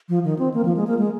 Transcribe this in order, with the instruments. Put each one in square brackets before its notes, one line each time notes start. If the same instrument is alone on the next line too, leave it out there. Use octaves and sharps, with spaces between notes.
[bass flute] F3
D#3
C4
A#3
F3
G#3
A#3
G#3